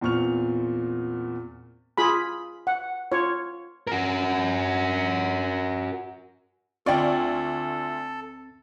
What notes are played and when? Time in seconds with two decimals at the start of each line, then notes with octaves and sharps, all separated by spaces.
0.01 E2 A#2 C4 C#6 F6 F7
1.98 F4 G#4 B5
2.67 F#5
3.12 F4 C#5
3.87 F#4 A#4
6.86 D2 C4 F4 A4 D5 G5 C#6